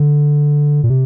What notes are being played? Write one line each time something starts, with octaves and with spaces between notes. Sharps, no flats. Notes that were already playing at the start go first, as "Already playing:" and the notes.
Already playing: D3
A#2
C3